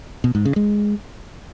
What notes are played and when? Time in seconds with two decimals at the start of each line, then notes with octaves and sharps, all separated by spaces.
0.24 B2
0.35 G#2
0.45 C#3
0.56 G#3